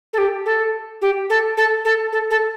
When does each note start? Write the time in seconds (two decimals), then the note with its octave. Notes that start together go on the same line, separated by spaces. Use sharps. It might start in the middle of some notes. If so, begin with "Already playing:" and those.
0.13 A4
0.18 G4
0.46 A4
1.02 G4
1.30 A4
1.57 A4
1.85 A4
2.12 A4
2.31 A4